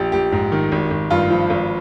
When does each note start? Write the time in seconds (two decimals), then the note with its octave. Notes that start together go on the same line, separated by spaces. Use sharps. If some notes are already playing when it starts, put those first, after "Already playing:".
Already playing: A#1 G4
0.12 A#1 G4
0.32 G#2
0.52 D#3
0.72 G#1
0.91 G#1
1.10 G2 F4
1.30 F3
1.50 G#1